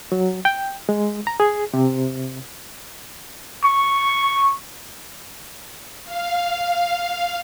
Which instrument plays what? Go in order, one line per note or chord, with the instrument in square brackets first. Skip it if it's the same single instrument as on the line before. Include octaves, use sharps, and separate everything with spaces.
[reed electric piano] F#3
G5
G#3
A#5
G#4
C3
[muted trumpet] C#6
[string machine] F5